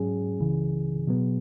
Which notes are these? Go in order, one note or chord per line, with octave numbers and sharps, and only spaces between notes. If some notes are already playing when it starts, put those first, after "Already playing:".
Already playing: G#2 F#3 C#4 G#4
C#2 C#3 E3
B2 F#3 B3